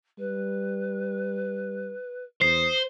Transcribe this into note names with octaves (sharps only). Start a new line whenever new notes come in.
G3 B4
E2 C5 D#6 C7